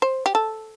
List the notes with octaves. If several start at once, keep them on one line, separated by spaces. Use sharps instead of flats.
C5
G4
A4